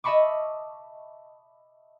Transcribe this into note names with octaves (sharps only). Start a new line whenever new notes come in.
D#5 E5 A5 B5 C#6 D6